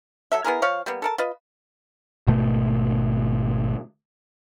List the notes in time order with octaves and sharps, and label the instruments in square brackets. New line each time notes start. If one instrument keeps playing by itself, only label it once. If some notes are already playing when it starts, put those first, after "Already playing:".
[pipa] F#3 A4 E5
B3 E4 G#4 A#4
F3 C#5 F5
G3 A#3 B3
A4 A#4 A5
F4 B4 D#5
[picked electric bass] G#1 B2 A3